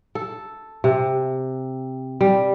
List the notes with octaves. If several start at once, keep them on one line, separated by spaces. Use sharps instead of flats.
A4
C3
G3